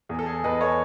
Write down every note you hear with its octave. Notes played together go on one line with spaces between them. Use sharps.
E2 G#4
A4
G#4
E2 B4 D#5
A4 C#5